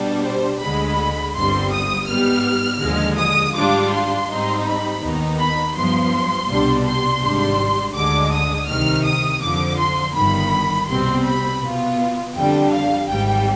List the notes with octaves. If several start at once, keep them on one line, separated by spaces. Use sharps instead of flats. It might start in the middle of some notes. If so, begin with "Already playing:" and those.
Already playing: B2 G3 D4
C5
D2 D3 G#3 B5
G1 G2 D3 G3 C4 C6
D#6
G#2 G3 B3 F6
D#2 D3 F3 G#3
D#6
G#2 G3 D4 F4 D6
C6
G#2 G3 C4 D#4
B5
D#2 D#3 B3 D#4
B5
G2 F3 B3 C6
C2 B2 G3 D4
C6
G#1 G#2 G3 D4
D2 D3 G#3 D4 D6
D#6
C2 C3 D#3 F6
D#6
F2 D3 F3 D6
C6
G1 G2 D#3 B5
C2 B2 G3 C4 C6
B5
B2 B3 F4
F2 D3 G3 D4 G5
F5
G#1 G#2 G3 G5